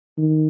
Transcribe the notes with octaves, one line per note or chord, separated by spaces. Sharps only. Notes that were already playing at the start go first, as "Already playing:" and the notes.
D#3